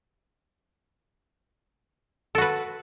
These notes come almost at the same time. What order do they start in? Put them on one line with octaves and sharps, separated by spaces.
A4 F#4 B4